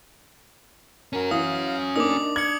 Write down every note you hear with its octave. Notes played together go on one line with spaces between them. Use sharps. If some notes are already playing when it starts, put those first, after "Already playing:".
C#4 F#4 A#4
E3 F5 D#6
A#3 D4 D#4 D6 D#6
G#6 C#7 F#7